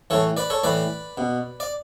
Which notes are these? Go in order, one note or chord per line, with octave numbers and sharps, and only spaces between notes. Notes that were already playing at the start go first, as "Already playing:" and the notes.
A2 E3 A4 C#5
B4 D5
A4 C#5
A2 E3 B4 D5
B2
D5